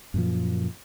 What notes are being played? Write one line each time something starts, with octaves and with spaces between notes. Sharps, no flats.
F#2 A#2 F3